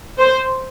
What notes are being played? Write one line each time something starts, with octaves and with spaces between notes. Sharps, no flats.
C5